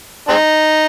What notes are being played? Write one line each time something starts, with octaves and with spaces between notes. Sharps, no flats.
G#3 C4 D#4